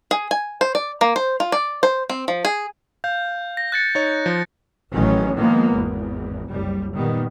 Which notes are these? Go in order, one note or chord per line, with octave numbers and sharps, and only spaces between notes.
G#4
G#5
C5
D5
A#3
C5
F4
D5
C5
C4
F3
G#4
F5 G6
A#6
F#6 A6 C#7
D#4 C#5
F3
A1 D#3 E3 F#3 C#4
D#3 F3 G#3 A#3 B3
G#1 E2
F#1 C2 G3
A#2 D#3 G3 B3